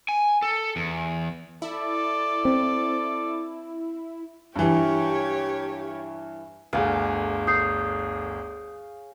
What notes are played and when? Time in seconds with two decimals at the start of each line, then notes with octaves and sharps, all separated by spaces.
0.08 G#5
0.42 A4
0.76 E2
1.62 E4 A4 D5
2.45 C4
4.56 G2 E3 G4 C#5
6.73 G1 D2 G#4 F5
7.47 C#5 D#6 G6 C7